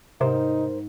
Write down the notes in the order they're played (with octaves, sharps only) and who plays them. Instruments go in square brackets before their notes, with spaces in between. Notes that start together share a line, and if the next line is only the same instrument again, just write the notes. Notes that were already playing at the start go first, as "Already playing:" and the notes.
[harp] G#2 [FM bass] C3 [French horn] D#4 [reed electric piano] A#4 C5